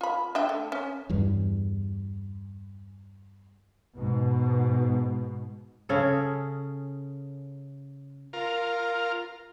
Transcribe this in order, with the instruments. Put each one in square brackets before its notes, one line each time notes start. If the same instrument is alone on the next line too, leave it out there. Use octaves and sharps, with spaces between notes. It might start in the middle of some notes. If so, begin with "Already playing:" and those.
[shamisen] F4 B5
D4 E5 G5
A3
C#4
[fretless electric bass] E2 G2
[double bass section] G#2 B2
[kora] C#3 C#4 G#4 A4
[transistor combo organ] F4 A#4